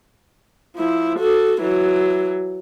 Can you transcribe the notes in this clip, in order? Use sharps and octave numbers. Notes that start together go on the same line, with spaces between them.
F3 E4
F#4 A4
E3 F#3